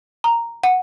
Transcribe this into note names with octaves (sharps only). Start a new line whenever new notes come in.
A#5
F#5